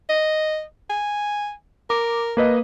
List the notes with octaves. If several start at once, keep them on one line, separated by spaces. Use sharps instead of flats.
D#5
G#5
A#4 D6
A#3 B4 D#5